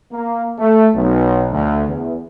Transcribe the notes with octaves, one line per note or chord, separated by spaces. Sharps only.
A#3
A3
B1
D2
E2